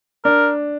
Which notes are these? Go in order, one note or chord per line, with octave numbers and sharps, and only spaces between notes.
D4 A#4